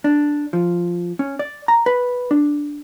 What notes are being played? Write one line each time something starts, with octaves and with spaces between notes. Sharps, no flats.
D4
F3
C#4
D5
A#5
B4
D4